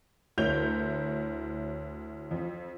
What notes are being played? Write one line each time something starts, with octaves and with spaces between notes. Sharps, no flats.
D2 E4 A#4 C#5 G6 F7
F2